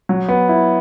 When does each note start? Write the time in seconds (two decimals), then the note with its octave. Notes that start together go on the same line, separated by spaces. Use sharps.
0.09 F#3
0.28 B3
0.49 E4